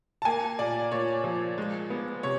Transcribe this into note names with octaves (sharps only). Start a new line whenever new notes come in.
A5
A#3 G#5
A#2 D5
A#2 C#5
F3
G#3
B3
C3 C#5